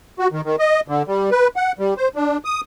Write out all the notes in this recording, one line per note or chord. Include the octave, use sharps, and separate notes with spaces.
F#4
D#3
D#3
D#5
D3
G3
B4
F#5
G3
C5
D4
D#6